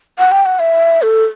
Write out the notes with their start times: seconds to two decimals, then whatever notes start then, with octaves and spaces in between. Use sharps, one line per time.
0.19 F#5
0.32 G5
0.46 F#5
0.59 E5
1.02 A4